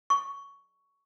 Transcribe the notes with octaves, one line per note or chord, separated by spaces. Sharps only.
C#6